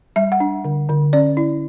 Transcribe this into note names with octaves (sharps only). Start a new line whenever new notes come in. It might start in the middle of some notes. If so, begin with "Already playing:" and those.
G3 E5
F#5
D4
D3
D3
C#4 D5
E4